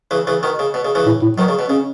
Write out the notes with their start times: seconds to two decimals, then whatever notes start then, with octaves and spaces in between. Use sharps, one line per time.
0.11 C#3 E3
0.27 C#3 E3
0.43 B2 D#3
0.59 C#3
0.74 B2
0.85 C#3
0.95 C#3 E3
1.06 A2
1.22 A2
1.38 B2 D#3 F#3
1.48 C#3
1.59 B2
1.69 C#3 C#4